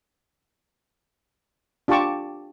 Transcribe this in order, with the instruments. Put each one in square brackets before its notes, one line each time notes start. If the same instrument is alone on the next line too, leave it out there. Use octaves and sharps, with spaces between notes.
[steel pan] D4 F4 G4 A5 C#6 D6